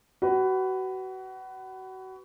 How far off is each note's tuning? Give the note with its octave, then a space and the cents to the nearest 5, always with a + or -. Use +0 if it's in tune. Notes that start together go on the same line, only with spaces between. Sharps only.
F#4 +30 B4 +15